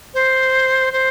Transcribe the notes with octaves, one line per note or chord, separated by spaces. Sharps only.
C5
C5